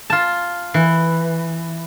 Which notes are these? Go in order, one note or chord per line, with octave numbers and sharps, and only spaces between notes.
F4 A5
E3